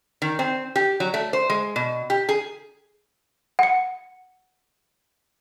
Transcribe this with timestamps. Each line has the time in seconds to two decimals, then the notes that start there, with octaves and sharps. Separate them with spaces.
0.22 D#3
0.39 C4
0.76 G4
1.00 F#3
1.14 A3
1.33 C5
1.50 G#3
1.76 B2
2.10 G4
2.29 G#4
3.59 F#5 C#7